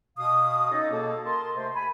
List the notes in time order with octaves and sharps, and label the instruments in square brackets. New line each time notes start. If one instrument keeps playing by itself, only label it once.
[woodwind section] B2 F5 D#6
C#4 D#4 A4 C#5 D#5
B2 A#3 G#4 A4
A#4 D#5 A5 C6
C3 A3 G4 C5
G#5 B5